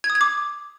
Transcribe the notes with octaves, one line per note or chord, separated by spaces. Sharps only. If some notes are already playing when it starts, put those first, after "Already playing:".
G#6
D#6
G#6
D6